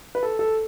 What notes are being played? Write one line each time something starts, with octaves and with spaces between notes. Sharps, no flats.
B4
A4
A4